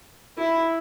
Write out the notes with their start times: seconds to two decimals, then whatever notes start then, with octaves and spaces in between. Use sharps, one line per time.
0.38 E4